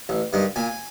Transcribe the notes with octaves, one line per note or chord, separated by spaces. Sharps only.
A1
G2 D#3
A#2 G#5